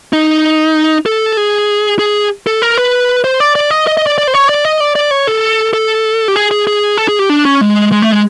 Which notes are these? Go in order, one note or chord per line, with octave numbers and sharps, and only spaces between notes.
D#4
A4
G#4
G#4
A4
A#4
B4
C5
D5
D5
D#5
D#5
D#5
D5
D5
C5
C#5
D5
D#5
D5
D5
C#5
A4
A4
G4
G#4
G#4
G#4
A4
G#4
G4
D4
C#4
G#3
G#3
A3
G#3